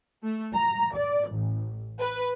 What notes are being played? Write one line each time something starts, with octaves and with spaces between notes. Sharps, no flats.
A3
A#5
D5
A1
B4